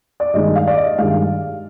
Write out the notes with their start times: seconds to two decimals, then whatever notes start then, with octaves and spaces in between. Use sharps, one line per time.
0.20 D5
0.34 G2 D#3 G#3 D#5
0.56 F5
0.67 D5
0.77 D#5
0.98 G2 D#3 G#3 F5